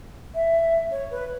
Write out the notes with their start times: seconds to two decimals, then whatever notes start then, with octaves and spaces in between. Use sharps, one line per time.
0.35 E5
0.91 C#5
1.11 B4